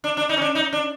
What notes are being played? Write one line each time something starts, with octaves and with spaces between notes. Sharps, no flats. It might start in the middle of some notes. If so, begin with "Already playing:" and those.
D4
D4
D#4
C#4
D4
D#4
D4